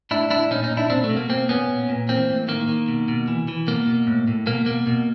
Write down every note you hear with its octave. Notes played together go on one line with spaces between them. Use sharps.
A2 D4 E4
A2 D4 E4
A#2 C#4 D#4
C#4 D#4
A#2
D4 E4
B2 C4 D4
A3
B2
A#3
B2 A#3 C4
B2 B3 C#4
A#2
A#2
E3 A#3 C4
A2
D#3 A#3
D#3
B2
B2
E3
E3
B2 A#3
B2
A2
A2
B2 A#3
B2 A#3
B2